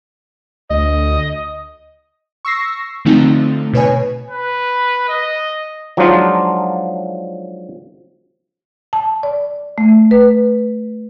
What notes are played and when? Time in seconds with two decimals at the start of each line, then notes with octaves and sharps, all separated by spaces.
0.70 D2 D#5
2.45 C#6 E6 A#6 C7
3.05 D3 F3 A3 C4 D#4
3.73 B2 B4 C#5 G#5
4.30 B4
5.09 D#5
5.97 F3 F#3 G#3 D4 D#4 F4
8.93 A5
9.23 D5
9.78 A3
10.11 B4